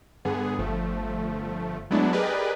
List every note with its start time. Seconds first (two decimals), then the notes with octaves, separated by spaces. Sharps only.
0.25 G2 D3 B3 G#4
0.59 G1 F3 A3
1.91 F#3 G#3 A3 B3 D4 E4
2.13 G4 G#4 A#4 B4 D5 D#5